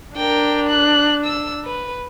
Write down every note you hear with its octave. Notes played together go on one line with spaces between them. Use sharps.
D4 A#4 G5
F#6
E6
B4